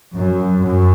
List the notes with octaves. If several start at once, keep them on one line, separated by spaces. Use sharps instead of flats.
F#2
F#2